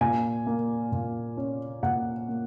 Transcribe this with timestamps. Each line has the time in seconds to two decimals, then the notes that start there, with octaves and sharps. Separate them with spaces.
0.01 A#2 G#5
0.47 A#3
0.92 A#2
1.37 C#4
1.83 A#2 F#5
2.29 A#3